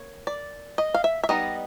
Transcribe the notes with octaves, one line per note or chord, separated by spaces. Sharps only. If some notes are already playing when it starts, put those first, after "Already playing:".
Already playing: A#3 C#5
D5
D#5
F5
E5
E5
G3 B3 D#4 D#5